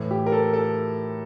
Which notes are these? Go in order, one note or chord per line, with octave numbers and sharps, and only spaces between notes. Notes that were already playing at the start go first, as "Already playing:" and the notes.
Already playing: A2 E3
G4
A#4
A4
A4